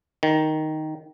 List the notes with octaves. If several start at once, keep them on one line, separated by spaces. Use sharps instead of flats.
D#3